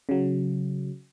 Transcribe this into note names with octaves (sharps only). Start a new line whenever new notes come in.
C#3 F#3